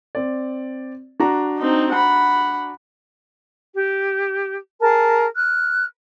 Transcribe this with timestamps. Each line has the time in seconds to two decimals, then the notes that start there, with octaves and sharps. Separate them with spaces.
0.15 C4 D5
1.20 D4 F#4 A#5
1.58 C4 D#4
1.93 F#5 B5
3.73 G4
4.81 G#4 A#4 A5
5.36 F6 F#6